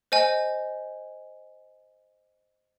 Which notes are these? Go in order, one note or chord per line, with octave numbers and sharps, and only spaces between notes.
C5 D#5 G#5